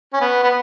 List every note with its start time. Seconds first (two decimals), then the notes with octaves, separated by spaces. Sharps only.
0.13 C#4
0.21 B3
0.43 B3